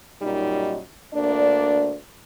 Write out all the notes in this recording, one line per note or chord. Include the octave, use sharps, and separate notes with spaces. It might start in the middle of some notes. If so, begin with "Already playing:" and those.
F#2 A#2 G3 D#4
D2 A#3 D4 D5